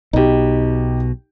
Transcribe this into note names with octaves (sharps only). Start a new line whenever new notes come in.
B1 B2 D#4 G4